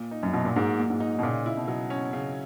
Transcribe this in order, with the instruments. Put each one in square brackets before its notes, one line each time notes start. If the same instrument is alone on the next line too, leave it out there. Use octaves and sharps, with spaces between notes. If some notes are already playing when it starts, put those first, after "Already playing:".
Already playing: [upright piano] A#2
D#4
[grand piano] F#2
[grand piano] B2 [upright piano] F#3
[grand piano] A#2
[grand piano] G#2 [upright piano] A#3
[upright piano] A#2
[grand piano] G#2
[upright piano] D#4
[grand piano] B2
[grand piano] A#2 [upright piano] C#3
[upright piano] E4
[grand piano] B2
[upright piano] F#3
C#4
C#3